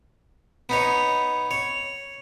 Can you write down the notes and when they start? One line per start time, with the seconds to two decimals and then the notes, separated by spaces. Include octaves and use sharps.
0.69 B3 D#4 C#5
1.51 C#5